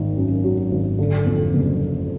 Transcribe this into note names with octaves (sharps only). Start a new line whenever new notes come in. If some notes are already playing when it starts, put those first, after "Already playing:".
Already playing: G#1 D#3
F#2
F#3
G#1
D3
F2
F#1